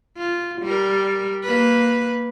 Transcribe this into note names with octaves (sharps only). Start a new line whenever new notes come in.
F4
G3 A#4
A#3 B4